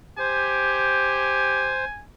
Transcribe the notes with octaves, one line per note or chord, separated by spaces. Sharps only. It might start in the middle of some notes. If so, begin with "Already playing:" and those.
G4 C5 G#5